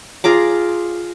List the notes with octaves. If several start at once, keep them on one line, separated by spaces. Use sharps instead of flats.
F4 G#4 A#5 D6